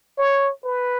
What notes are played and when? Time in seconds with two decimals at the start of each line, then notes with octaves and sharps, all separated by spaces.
0.18 C#5
0.64 B4